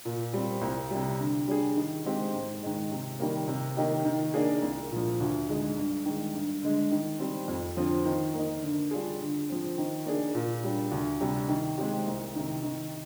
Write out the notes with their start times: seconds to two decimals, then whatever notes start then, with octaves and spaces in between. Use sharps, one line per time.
0.05 A#2
0.33 G3 C4
0.62 C2
0.90 C3 G3
1.19 D3
1.48 G3 D4 G#4
1.76 D#3
2.05 G#3 C4 G4
2.33 G#2
2.63 D#3 G#3
2.91 C3
3.20 D#3 G3 A#3
3.48 C3
3.77 D#3 A#3 D#4 G4
4.05 D#3
4.34 A#3 D4 G#4
4.62 C2
4.91 A#2 F3
5.20 D2
5.48 D3 G#3 D#4 G#4
5.78 G2
6.05 D#3 G#3
6.35 G2
6.63 D3 G#3
6.92 D#3
7.19 G3 C4
7.48 F2
7.77 D3 F3 C4 F4
8.05 D#3
8.34 A#3 D#4
8.63 D3
8.91 G3 D4 F4 G#4
9.21 D3
9.49 F3 C4
9.78 D#3
10.05 A#3 D4 G#4
10.35 A#2
10.64 G3 D4
10.91 D2
11.21 C3 G3
11.48 D#3
11.78 G#3 C4 G4
12.06 C2
12.35 C3 D#3
12.63 D#3